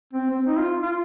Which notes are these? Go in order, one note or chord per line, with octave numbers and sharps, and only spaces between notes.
C4
C4
D#4
F4
F4